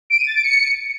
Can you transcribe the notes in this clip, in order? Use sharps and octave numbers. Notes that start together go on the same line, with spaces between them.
D7
D#7
A6
D7
C#7